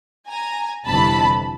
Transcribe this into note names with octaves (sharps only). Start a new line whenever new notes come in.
G#5 A#5
G1 F2 C3 E3 A5 B5